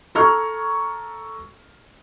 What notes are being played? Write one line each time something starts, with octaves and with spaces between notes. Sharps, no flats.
A4 A#5 C#6 F6 G#6